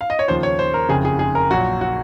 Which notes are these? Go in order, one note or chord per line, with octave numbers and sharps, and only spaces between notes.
F5
D#5
C#5
D#2 C#3 F3 C5
C#5
C5
A#4
F#1 F2 C#3 G#4
G#4
G#4
A#4
A#1 A#2 F#3 F#4
F#4